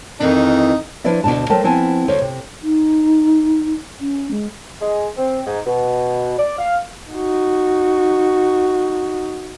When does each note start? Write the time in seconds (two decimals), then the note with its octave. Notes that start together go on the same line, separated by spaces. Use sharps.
0.20 F2 D#3 E3 D#4
1.04 F3 D4 E4 B4 D5 E5
1.24 D2 G2 B2 D4 A5
1.50 F#3 A3 A#4 C5 G5 A5
1.64 F3 B3 C4 E4 G#5 A5
2.08 D2 C5 C#5
2.22 C3
2.63 D#4
4.01 C#4
4.31 G#3
4.81 G#3
5.17 C4
5.45 G#2
5.66 B2
6.38 D5
6.58 F5
7.13 D#4 F#4